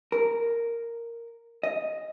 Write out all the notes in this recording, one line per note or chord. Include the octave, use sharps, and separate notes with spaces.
A#4
D#5